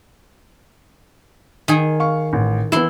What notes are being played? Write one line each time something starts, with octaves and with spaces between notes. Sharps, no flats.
D#3 G#4
F5 C#6
A1
E3 B3 E4 C6